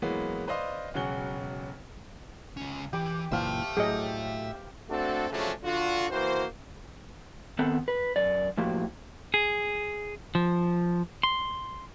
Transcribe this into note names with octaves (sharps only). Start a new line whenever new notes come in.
E3 F#3 G#3 A#3 B3
B4 C5 D5 D#5 F5 C6
E1 C#3 F#3 G#4 F#5 G7
C#2 C#4
E3 G4 D6
F#1 A#2 E3 C5 E5 F5 G5 A5
A2 F#3 G4 G#4 D#5
A3 C4 D4 F#4 A4
C#3 F3 F#3 A3 C#4 D4
D3 F4 F#4
E3 A#3 F#4 C5
D#3 B3 C4 A4 F#5
B4
F#2 D5
A2 F3 A#3 F#4 G4
G#4
F3
C6